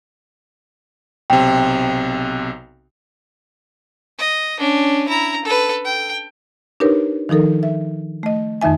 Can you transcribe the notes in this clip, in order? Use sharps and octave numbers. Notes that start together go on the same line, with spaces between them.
B1 C3 G5
D#5
C#4 D4
E4 A#5
A4 B4
G5
D4 D#4 G4 A#4 B4 C#5
D#3 F3 D#4 A4 A#4
E5
A3 D#5
F2 D#3 D#4 E5 G#5